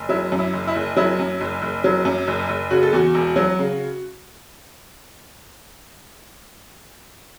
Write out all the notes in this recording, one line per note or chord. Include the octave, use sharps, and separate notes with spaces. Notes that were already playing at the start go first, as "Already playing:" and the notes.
Already playing: F#1
F#3 E4
F#2
E4
F#1
E4
F#1
F#3 E4
F#2
F#1
F#1
F#3
F#2
F#1
F#1
C#3 F#4
A4
E2 F#4
E1
F#3
C#3